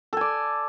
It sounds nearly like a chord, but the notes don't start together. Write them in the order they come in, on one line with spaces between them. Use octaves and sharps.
A4 G#5 D5